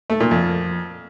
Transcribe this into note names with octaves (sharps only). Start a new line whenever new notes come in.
A3
A#2
F2